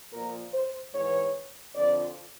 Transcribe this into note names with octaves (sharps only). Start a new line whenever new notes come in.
A#2 F3 A#4
C5
G#2 E3 C#5
F2 D3 F3 D5